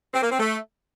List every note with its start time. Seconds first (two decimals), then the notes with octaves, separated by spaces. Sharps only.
0.14 C4
0.22 A#3
0.31 C4
0.39 A3